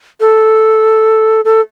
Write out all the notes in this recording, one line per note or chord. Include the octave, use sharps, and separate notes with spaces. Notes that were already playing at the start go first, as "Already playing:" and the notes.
A4
A4